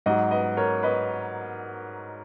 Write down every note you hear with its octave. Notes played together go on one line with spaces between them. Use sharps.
G#2 F#3 D#5 F#5
B4 D#5
A#4 C#5
B4 D#5